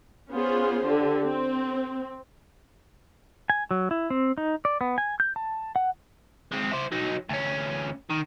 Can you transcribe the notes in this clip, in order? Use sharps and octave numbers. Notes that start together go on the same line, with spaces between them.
B3 C#4 F4 G#4 C5
D3 G4
C4
G#5
F#3
E4
C4
D#4
D5
B3
G#5
G6
A5
F#5
G#3 C4
E4 C5
F#3 D#4
D2 C#4
D#3